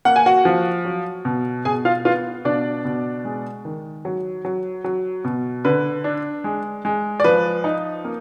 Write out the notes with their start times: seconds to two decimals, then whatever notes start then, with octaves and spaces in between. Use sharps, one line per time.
0.05 A#3 F#5
0.16 G#5
0.26 F#4 F#5
0.45 F3
0.85 F#3
1.25 B2
1.65 B2 G#4 G#5
1.85 F4 F5
2.05 B3 F4 F5
2.45 B2 D4 D5
2.85 B2
3.25 G#3
3.65 D#3
4.05 F#3
4.45 F#3
4.84 F#3
5.24 B2
5.65 D3 B4
6.04 D4
6.44 G#3
6.85 G#3
7.20 D5
7.24 F3 B4
7.64 D#4
8.05 A#3